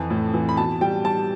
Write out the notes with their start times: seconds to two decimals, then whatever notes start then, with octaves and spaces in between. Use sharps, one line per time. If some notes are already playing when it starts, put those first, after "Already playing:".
Already playing: F2 E3
0.10 A2
0.34 E3
0.49 B5
0.57 B2 A5
0.81 G3 G5
1.04 G3 A5